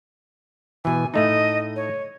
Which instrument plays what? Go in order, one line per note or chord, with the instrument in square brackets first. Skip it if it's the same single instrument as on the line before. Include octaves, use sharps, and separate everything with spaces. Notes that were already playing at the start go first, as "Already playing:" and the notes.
[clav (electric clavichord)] B2 E3 [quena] G#5
[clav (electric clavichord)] A2 A3 D#4 [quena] D#5
[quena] C#5